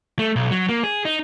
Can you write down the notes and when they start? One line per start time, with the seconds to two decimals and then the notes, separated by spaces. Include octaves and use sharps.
0.19 A3
0.36 B1
0.51 F#3
0.69 A#3
0.84 G#4
1.05 D#4